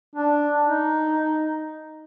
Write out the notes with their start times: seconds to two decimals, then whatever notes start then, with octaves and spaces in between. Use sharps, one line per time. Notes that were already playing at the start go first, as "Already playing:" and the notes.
0.16 D4
0.65 D#4